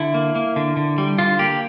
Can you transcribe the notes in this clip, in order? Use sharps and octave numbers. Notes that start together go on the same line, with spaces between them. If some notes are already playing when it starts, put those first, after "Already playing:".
Already playing: D3 E4
A#3
A#3
D3
D3
G3
D3 F4
A#3 G4